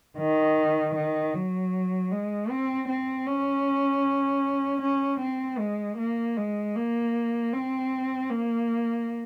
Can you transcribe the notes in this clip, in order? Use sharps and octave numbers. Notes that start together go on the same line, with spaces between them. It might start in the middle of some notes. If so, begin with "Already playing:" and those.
D#3
D#3
F#3
G#3
C4
C4
C#4
C#4
C4
G#3
A#3
G#3
A#3
C4
A#3